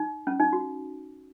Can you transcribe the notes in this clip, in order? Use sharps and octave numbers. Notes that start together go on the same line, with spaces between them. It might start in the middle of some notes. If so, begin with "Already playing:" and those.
Already playing: D#4
C#4
D#4
F#4